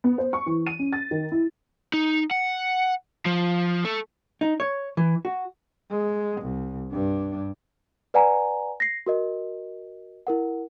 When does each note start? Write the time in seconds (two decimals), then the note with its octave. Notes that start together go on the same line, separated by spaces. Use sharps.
0.04 B3
0.18 C5
0.33 C#6
0.46 E3
0.67 D#7
0.79 C#4
0.93 A6
1.11 D#3
1.32 E4
1.94 D#4
2.31 F#5
3.26 F3
3.84 A3
4.41 D#4
4.60 C#5
4.97 E3
5.25 F#4
5.91 G#3
6.42 C2
6.93 G2 D4
8.14 B4 D5 F#5 G#5 A#5
8.80 A#6 C7
9.06 F#4 A#4 D#5
10.27 E4 A#4 F#5